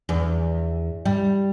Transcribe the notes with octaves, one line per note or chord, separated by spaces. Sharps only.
E2
G3